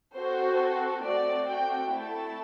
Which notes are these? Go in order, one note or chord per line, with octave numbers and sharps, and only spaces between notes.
C4 F#4 A4 C5
A3 C4 F#4 D5
G5
A3 E4 A4 A5